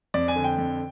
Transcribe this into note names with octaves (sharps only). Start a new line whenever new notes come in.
F2 D5
G#5
D3
G5
F2